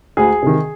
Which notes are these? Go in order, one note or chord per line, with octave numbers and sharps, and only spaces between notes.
D2 G#4
C3 D#3